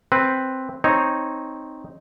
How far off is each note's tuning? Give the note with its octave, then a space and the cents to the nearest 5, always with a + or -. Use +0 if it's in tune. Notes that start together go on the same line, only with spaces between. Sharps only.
C4 +0 B4 +0
C4 +0 D#4 +0 C#5 -10